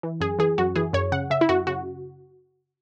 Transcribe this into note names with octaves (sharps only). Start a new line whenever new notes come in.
E3
F#2 G#4
E3 G#4
F#2 F#4
E3 G#4
F#2 C#5
C#3 F#5
C#3 E5
E4
F#2 F#4
C#3 F#4